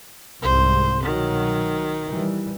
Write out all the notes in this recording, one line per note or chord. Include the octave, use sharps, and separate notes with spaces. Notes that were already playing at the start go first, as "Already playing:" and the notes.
C2 G#2 C5
B2 D#3 F#3
E3 G3